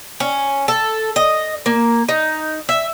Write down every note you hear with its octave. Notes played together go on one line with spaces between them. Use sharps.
C#4
A4
D#5
A#3
D#4
E5